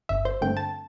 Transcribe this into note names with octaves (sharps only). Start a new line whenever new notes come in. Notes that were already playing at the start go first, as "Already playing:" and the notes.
G1 E5
C5
G2 D3 A3 C4 G5
A5